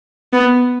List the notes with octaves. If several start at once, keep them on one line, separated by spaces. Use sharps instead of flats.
B3